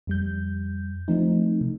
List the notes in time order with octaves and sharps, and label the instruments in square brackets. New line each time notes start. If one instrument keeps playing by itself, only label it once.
[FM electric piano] F2 G3 G6
E3 F3 A3 C4 D#4
C3